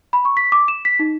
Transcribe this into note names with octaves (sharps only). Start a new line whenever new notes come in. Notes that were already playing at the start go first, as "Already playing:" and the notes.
B5
C#6
B6
D6
E7
B6
D#4